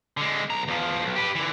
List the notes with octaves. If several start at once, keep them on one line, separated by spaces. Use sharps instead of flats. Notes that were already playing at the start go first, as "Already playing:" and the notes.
D3 G#3
B1 A#5
E2 F3
B1
G4 B4
D3 E3